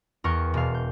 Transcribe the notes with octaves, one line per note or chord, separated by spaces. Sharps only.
E2 A#4 G5 C#6
E1 F5
G6